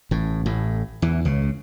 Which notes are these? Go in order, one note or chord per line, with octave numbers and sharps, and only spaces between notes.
A1 A2
A1 A2
E2 E3
C#2 C#3